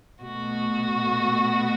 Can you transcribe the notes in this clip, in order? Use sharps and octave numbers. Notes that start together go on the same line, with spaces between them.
B2 A3 F#4